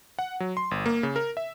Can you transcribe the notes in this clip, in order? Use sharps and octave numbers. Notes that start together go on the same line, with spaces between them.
F#5
F#3
C6
G1
A#3
C#3
A#4
E5